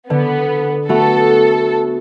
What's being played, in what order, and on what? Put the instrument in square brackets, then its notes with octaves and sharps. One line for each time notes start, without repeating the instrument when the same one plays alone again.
[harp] D3 [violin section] B3
[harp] A3 B3 F#4 [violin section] A4